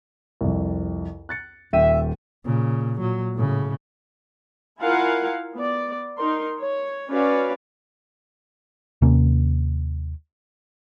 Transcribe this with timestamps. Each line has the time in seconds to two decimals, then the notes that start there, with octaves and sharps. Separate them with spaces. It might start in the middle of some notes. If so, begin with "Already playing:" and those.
0.41 C2 F2
1.29 F#6 A6 C#7
1.73 D#1 E5 G5 D#7
2.44 A#2 C#3
3.00 A#2 F#3
3.35 A2 C#3
4.80 E4 F4 A#4 F5 F#5 G#5
5.55 B3 D5
6.18 D#4 A#4 C6
6.59 C#5
7.10 C#4 F#4 B4 C#5 D5 F5
9.02 D#2 C3 A#3 C#4